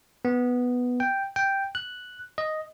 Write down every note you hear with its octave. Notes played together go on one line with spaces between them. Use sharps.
B3
G5
G5
F#6
D#5